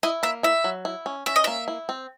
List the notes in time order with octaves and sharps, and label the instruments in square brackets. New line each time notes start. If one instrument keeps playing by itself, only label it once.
[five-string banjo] E4 [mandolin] D#5
[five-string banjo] A#3 [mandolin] E5
[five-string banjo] E4 [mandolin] E5
[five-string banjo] F#3
E4
C#4
[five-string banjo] C#4 [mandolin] E5
[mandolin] D#5
[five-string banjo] A#3 [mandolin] E5
[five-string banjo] E4
C4